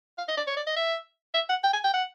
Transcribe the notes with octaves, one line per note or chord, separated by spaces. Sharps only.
F5
D#5
D5
C#5
D5
D#5
E5
E5
F#5
G5
G#5
G5
F#5